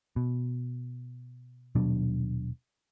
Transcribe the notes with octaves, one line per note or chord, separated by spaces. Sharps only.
B2
D#1 B2 F#3 D4